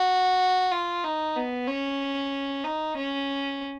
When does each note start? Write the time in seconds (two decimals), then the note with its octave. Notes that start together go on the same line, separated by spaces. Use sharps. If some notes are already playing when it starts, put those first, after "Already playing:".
Already playing: F#4
0.72 F4
1.04 D#4
1.36 B3
1.68 C#4
2.64 D#4
2.97 C#4